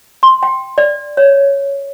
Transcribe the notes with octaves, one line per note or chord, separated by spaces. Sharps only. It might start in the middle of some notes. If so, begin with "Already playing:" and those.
C6
G5
D5
C#5